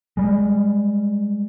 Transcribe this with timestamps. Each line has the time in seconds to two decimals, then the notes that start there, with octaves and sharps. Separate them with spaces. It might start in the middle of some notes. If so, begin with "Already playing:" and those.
0.17 G3 G#3